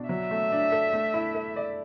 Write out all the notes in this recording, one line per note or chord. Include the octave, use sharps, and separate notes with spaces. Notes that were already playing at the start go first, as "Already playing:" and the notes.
Already playing: B2 D4
F#3 E5
A3
D4
A4
A3
E4
A4
D5